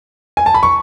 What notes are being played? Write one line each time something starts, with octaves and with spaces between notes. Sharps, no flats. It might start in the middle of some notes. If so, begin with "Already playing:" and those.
G#5
A5
B5
C#6